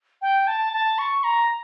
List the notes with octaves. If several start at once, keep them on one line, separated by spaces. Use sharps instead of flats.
G5
A5
A5
C#6
A#5